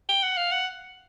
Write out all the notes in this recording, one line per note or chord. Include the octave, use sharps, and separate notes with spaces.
G5
F#5
F5
F#5